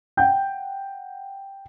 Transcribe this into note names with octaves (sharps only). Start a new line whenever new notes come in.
F#5 G5 G6